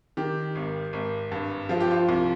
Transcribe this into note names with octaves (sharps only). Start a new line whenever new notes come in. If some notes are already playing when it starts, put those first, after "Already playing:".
D#3 G4
G#1
G#1
G2
F3 F4
G4
F4
C2